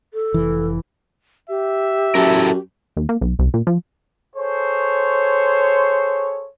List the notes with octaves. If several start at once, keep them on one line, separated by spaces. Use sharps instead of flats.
A4
F1 E3
G4 E5
F#2 E4 A4 A#4
D#2
A#3
B1
C2
A#2
F3
G#4 A4 C5 C#5